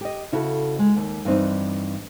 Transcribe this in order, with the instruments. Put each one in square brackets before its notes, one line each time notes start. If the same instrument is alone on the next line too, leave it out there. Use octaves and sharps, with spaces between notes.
[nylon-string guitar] G4 D#5
C#3 E4 F#4 A4
G#3
D#2
G2 E3 C4 D#4